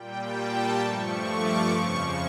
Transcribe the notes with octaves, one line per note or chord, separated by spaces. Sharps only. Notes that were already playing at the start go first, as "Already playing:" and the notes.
Already playing: A#2 G3 G5
A5
G2 F3 A3 C#6
D6
F2 C#3 F3 C#6